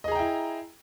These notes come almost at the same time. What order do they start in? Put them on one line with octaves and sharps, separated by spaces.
D#5 G#4 A#5 G5 E4